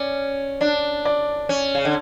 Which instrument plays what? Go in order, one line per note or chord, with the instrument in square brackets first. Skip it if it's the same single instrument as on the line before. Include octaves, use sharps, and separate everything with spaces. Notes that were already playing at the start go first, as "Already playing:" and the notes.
Already playing: [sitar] C#4 [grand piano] D5
[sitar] D4 [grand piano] D5
[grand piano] D5
[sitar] C#4
C#3
D3